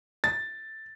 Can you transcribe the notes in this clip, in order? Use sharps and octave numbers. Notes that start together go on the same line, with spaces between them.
A6